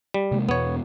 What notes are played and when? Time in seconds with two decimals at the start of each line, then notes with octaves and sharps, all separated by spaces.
0.14 G3
0.32 C3 G#3 A#3
0.49 E2 B2 B3 C#5